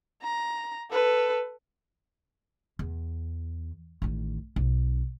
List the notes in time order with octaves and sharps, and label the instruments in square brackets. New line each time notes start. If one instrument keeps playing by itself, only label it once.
[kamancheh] A#5
A4 B4
[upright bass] E2
A1 D#3
B1